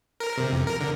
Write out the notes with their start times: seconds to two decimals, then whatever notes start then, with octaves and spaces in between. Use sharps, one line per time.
0.20 A#4
0.37 C3
0.53 F2
0.67 A#4
0.81 D3